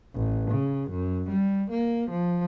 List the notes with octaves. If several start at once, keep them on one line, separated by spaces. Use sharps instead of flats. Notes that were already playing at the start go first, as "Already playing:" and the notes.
A1
C#3
F#2
G3
A#3
F3